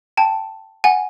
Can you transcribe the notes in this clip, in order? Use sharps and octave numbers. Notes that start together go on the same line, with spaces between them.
G5 A5
F#5 G#5